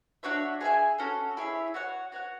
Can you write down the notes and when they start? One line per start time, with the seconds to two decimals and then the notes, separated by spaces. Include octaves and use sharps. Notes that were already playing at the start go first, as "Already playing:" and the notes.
0.23 D4 F#4 C#5 E5
0.61 G#4 C#5 E5 G#5
0.98 C#4 F#4 A4
1.37 E4 G#4 C#5 E5
1.74 F#4 C#5 F#5
2.12 F#4 C#5 F#5